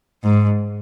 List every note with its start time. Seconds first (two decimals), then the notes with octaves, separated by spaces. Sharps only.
0.23 G#2